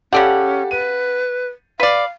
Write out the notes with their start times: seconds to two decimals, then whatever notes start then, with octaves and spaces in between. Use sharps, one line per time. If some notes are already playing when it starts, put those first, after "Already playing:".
0.13 C#3 C#4 G4 A4 D5 F#5
0.71 B4 D#7
1.80 B4 D5 F5